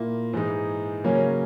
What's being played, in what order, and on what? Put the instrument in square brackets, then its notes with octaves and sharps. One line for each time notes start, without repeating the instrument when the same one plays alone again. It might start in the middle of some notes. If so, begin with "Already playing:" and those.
Already playing: [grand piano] A#2 A#3 E4
G#2 E3 G#3 D#4
C#3 F#3 A#3 C#4